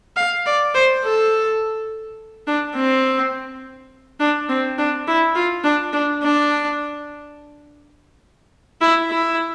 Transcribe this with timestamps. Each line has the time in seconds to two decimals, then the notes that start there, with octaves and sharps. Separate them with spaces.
0.16 F5
0.46 D5
0.75 C5
1.04 A4
2.47 D4
2.76 C4
4.20 D4
4.49 C4
4.78 D4
5.07 E4
5.35 F4
5.64 D4
5.93 D4
6.23 D4
8.81 E4
9.10 E4